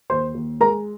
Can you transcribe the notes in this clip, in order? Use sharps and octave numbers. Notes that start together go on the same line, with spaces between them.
D#2 C5 C6
D#2
G#3 A#4 A#5